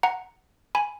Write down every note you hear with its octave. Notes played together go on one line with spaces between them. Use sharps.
F#5 A#5
G#5 B5